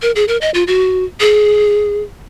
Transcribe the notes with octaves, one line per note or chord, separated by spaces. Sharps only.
A#4
G#4
A#4
D#5
F4
F#4
G#4